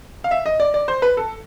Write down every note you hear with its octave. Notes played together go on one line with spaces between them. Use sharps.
F5
E5
D#5
D5
D5
C5
B4
A4